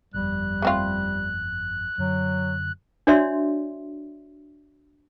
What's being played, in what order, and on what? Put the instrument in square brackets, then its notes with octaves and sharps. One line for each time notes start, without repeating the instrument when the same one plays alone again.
[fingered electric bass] G1 F2 [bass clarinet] G3 [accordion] F#6
[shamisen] A3 C4 F4
[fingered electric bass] F#2 D3 [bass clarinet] F#3
[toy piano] D4 F#4 C#5 D5 E5 C6